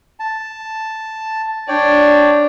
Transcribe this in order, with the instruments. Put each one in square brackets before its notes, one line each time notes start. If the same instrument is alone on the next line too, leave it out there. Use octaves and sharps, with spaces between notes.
[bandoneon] A5
[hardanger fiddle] D4 [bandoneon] C#5 D5 G5